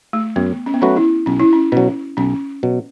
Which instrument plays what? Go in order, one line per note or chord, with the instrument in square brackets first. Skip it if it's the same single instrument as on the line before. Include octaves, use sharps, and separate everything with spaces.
[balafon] A3
[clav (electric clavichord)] F#2 [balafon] B3
[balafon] C#4
B3
[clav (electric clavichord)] F#3 A3 F#4 B4 [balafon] C#4
[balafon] E4
[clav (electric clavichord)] B1 [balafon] C#4
[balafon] E4
C#4
[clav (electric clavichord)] B2 F#3 [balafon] C#4
[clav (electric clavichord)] B1 [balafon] C#4
[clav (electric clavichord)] B2 F#3